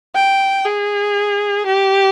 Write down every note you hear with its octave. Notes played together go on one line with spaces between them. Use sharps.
G5
G#4
G4